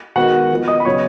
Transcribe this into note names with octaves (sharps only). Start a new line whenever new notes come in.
D#3 G#3 B3 F#4 F#5
F3 B3
D#5 D#6
B5
C#3 F#3 B3 C#5 C#6